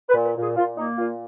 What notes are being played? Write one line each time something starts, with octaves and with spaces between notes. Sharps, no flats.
B4
A#2
B4
A#2 G#4
A#2 F4
A#3 D#4
A#2 F4